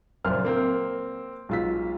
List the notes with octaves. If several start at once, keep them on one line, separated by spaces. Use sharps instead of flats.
F#1 A#2 F4 C5 F6
A#3 C4
B1 G#3 F4 E6 B6